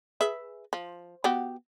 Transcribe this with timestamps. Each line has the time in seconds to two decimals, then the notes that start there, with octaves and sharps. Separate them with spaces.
0.21 G#4 B4 E5
0.73 F3
1.24 B3 F#4 G4